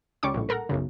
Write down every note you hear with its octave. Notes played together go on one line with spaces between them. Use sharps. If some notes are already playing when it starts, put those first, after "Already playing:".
C#2 G3 C#4 C#6 D6
A#1 A2
A4 A#4 F#5 A#5
B1 F#2 C#3